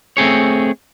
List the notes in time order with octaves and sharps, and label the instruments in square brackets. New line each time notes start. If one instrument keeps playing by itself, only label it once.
[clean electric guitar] A3 C4 G#4 C#5